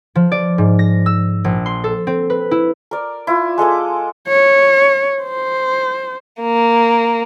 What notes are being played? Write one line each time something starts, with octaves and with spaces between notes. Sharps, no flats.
F3
D5
G#2
A#6
E6
A#1
C6
A4
C4
B4
E4
A#4 D5
E4 F4
G#3 A4 D#5 D6
C#5
C5
A#3